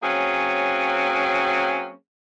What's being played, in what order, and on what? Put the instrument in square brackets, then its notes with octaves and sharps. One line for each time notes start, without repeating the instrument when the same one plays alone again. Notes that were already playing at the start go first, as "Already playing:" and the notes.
[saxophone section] F#3 A#3 C4 C#4 G#4